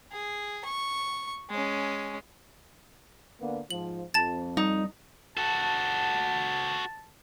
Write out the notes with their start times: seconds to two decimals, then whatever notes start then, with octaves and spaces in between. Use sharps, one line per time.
0.12 G#4
0.65 C#6
1.50 G#3 C#4
3.40 D3 A#3 B3
3.71 G#2 F3 F#7
4.14 F2 A5 A6
4.57 G3 D#4
5.37 F#4 A4 A5